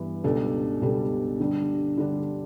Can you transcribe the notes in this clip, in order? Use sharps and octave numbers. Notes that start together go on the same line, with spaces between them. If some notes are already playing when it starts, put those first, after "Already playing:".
Already playing: G2 E3 B3
C#2 B2 G3 D4 A4
C#2 B2 G3 D4 A4
D3 G3 D4
D3 G3 D4